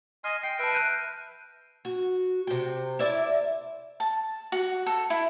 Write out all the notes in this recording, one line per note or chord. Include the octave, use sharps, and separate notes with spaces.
D#5 G#5 C6 F6 A#6
G5 C7
B4 E5 A5 D7
F#6 G6 D#7
F#4
C3 G5
E4 D5 E5
A5
F#4
A4
E4